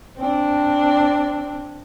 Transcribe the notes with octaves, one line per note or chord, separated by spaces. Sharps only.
C4 D4